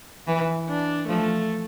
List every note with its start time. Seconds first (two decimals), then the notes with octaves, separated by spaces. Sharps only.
0.27 E3
0.69 D4
1.09 F3 A3